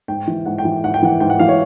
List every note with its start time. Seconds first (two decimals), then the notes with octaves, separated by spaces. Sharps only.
0.08 G#2 G5
0.27 E3
0.46 G#2 F#5
0.58 G5
0.65 E3
0.84 G#2 F#5
0.94 G5
1.03 E3 F#5
1.20 G#2 G5
1.30 F#5
1.39 E3 F5
1.49 C#5